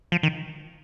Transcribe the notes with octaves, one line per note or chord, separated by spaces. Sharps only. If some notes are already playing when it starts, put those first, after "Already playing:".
F3
D#3